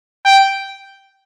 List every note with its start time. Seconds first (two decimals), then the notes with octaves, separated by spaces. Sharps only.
0.25 G5